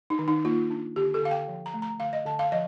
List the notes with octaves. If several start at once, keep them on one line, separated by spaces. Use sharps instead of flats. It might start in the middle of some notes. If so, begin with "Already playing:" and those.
D#4
D#3
D#4
A#3 F4
D4
D3 G4
A4
D3 F5
G5
F3
A#5
A3
A#5
D3 F5
D#5
D3 A5
F5
F3 D#5